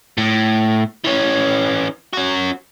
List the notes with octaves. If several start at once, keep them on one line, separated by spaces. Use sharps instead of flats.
A2
E3 C#4
C#4 F#4